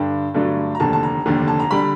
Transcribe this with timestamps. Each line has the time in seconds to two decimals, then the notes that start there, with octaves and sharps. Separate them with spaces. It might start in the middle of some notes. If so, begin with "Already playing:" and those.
Already playing: G2 D3 D4 G5
0.34 G2 D3 F#3 A3 D4
0.75 A#5
0.80 F1 D#2 D3 A5
0.93 A5
1.03 A#5
1.26 F1 D#2 D3
1.48 A5
1.60 A#5
1.71 D3 G3 B5